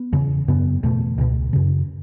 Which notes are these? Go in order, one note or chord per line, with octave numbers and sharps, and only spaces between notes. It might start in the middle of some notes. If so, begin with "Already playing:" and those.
Already playing: B3
E2 C#3
F#2 C#3 B3
E2 B2 A3
C#2 B2
F#2 C#3